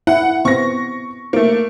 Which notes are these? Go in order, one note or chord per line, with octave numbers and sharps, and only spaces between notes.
E4 F#5
B3 C4 C#6 A#6
A3 A#3